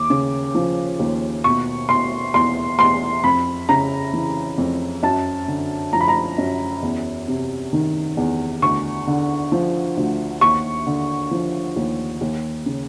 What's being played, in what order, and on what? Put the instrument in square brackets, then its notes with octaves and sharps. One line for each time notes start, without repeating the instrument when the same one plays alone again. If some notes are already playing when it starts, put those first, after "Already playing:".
Already playing: [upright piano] D#2 D6
C#3
F3
D#2
B2 C#6
B2 C6
E2 C6
E2 C6
F2 B5
C#3 A#5
E3
F2
F#2 A5
D3
F3 A#5
B5
A#5
F#2
E2
C3
D#3
E2
D2 C#6
D3
F3
D2
D#2 C#6
D3
F3
D#2
D#2
C#3